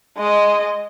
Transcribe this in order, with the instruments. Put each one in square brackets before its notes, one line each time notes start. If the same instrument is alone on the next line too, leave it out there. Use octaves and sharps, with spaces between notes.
[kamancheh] G#3 D#5